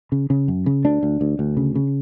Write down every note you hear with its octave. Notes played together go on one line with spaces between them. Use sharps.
C#3
C#3
F#2
C#3
D2 D4
D2
D2
D2
C#3
C#3